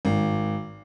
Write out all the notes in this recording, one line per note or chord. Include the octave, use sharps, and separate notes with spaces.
G#1